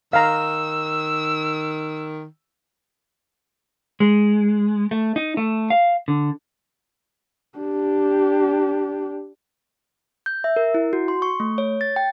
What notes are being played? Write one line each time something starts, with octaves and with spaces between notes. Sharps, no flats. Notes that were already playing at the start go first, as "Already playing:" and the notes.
D#3 F5 A#5 E6
G#3
A3
D#4
A3
F5
D3
D4 G4
G6
E5
A#4
E4
F#4
C6
C#6
A3
C#5
A6
G5